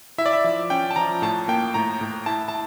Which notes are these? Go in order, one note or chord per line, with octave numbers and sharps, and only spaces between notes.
E4 E5
D5
E5
F3
C#4 G5
A5
F3 A#5
A2 A5
A#3 G5
A2 A#5
A2
E4 A5
A5